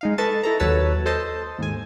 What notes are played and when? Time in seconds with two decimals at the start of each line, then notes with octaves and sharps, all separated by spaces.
0.01 G#3 D#4 F5
0.18 A4 B4 D#5 A5 C#6 A6
0.43 E4 A4 A#5
0.60 D#2 F#3 B4 C#5 A5 E6
1.06 A4 C5 D#5 A5
1.58 D#2 G#2 G#5